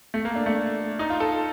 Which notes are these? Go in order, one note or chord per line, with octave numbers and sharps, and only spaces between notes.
A3
A#3
D4
A3
D#4
F4
A4